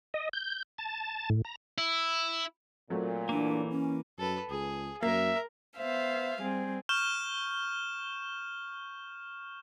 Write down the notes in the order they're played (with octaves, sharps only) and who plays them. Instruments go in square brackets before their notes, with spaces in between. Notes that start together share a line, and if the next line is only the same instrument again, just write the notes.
[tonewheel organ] D#5
G6
A5
A2
A#5
[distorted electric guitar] E4
[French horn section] A#2 [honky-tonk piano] F#3 A3 C4
[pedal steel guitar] E3 A#3 [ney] D4
[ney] C#4
[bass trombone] F#2 [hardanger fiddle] A4 B4
[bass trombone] C#2 [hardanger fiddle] G#4
[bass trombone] F#2 [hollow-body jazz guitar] A#3 [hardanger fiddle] A#4 [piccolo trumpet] E5
[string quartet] B3 C5 E5 F5
G3 C4 G#4
[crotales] C#6 F6 G6 E7 G7